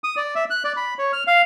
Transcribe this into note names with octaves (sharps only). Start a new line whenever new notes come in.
D#6
D5
E5
F#6
D5
B5
C#5
F6
F5